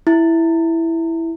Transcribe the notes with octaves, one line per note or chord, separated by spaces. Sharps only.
E4